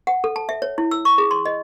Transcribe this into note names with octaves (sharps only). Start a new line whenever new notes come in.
F#5
A4
A5
E5
C#5
E4
E6
C#6
G#4
C6
D#5